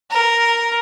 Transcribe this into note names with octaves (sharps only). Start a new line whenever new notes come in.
A#4